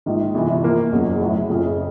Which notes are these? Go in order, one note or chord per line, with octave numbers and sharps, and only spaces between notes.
A#1 G#2 D#3
G1 F2 C3 E3
A#2 F3 A#3
F#1 E2 C#3 F#3
A#1 A2 F#3 A3
F#1 F2 C#3